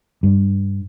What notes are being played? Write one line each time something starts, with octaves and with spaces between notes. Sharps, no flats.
G2